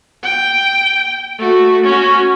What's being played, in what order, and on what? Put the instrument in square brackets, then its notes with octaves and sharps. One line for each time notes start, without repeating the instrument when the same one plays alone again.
[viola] G5
A3 F#4
C#4 F#4